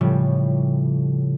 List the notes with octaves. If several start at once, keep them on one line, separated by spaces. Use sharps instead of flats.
A2 C#3 F3 G3